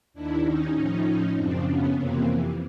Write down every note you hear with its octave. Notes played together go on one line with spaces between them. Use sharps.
D#2 D#3 D4 E4
C#4 D#4
A2 F3 C#4 D#4
F#2 C#3 F3 C4 D4
B3 C#4
F2 C3 E3 A#3 C4